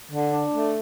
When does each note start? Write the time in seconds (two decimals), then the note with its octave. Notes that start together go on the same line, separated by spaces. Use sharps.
0.10 D3
0.31 D4
0.52 A3